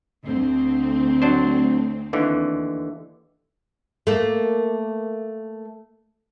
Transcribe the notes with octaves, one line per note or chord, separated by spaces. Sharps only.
D2 C4
F#3 D4 C5
D#2 D3 E3
A3 A#3